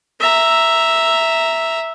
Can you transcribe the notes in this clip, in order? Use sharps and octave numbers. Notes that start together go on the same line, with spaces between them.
E5 A#5